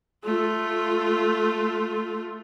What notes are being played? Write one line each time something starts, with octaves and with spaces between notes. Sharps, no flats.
A3 F4